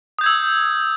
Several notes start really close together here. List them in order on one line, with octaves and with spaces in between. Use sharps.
D#6 G6 G#6 E6